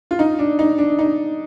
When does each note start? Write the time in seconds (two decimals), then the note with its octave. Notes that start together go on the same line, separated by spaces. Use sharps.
0.11 F4
0.19 D#4
0.39 D4
0.59 D#4
0.78 D4
0.99 D#4